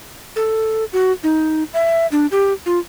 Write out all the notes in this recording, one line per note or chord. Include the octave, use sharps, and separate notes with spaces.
A4
F#4
D#4
E5
D4
G4
F4